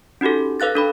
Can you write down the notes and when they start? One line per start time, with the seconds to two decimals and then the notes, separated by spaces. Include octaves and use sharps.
0.21 C#4 D#4 F#4 G4 A4
0.60 A4 B4 F5 F#6 A6
0.75 D4 A4 B5